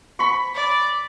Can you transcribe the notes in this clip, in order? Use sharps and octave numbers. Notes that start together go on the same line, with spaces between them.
B5 C#6
D5